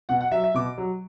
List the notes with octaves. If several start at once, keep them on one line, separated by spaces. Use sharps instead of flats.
B2 F#5
F#5
F#3 E5
E5
B2 D6
F#3